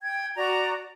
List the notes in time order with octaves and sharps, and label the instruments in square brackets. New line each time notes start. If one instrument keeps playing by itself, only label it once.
[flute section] G5 G#6
F#4 D5 A#5